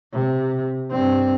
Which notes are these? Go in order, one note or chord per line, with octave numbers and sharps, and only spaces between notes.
C3
G2 C4